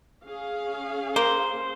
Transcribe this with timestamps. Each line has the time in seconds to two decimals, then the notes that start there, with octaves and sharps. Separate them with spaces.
0.25 C#4 G#4 F5
1.16 A#3 C5